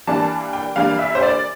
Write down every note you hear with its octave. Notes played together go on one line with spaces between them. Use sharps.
E3 G3 A#3 D4 A5
G5
E3 G3 A#3 D4 F5
E5
C5
D5